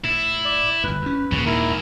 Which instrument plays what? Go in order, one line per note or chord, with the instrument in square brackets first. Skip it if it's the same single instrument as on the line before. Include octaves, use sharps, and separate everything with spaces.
[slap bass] A2 [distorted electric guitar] E4
[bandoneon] D5
[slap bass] G1 F2 [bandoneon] B4
[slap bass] E2 C#4
[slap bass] D#2 A#2 A#3 [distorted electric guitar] C#3
[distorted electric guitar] G#2 D#3 [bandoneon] E4 A#4